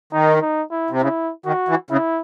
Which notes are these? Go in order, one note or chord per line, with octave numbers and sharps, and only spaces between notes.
D#3 D#4
D#4
E4
C3
C#3 E4
D#3 F#4
E3
C#3 E4